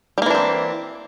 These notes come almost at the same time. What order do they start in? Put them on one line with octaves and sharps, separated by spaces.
G3 A#3 E3 D4 C4